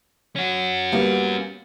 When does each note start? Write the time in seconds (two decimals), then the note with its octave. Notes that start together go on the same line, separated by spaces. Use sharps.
0.36 C#4 F#4
0.92 G3 A#3 B3